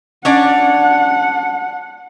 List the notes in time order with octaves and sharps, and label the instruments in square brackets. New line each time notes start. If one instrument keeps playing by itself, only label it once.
[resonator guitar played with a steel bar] C#4 D4 D5 [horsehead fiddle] F#5